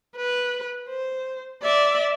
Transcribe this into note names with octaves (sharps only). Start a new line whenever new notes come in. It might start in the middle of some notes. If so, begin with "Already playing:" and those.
B4
C5
D5 E5